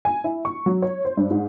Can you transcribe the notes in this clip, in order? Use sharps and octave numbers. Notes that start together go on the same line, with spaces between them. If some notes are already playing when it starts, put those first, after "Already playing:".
G#5
E4
C#6
F#3
C#5
C5
G2
G#2